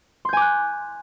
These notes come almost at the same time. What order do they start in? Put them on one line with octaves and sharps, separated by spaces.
C6 G6 G#5 D6 F#6